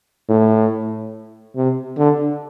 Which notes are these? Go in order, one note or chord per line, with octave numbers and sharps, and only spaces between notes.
A2
C3
D3